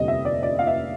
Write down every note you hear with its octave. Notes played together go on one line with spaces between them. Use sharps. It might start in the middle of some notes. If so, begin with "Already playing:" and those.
Already playing: F1 D#2 D3 G3 C4 D#5
E5
D5
D5
F5
E5